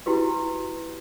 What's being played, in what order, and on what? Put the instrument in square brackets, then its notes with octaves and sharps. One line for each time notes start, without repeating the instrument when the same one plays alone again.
[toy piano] E4 F#4 G4 B4